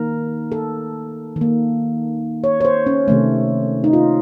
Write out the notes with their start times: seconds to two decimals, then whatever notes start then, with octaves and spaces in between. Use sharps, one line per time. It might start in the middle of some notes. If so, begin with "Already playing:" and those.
Already playing: D#3 A#3 A#4
0.52 A4
1.36 D#3
1.41 A#3
2.44 C#5
2.61 C#5
2.65 C5
2.86 C#4
3.08 C3 D#3 A3
3.84 D#4
3.93 F4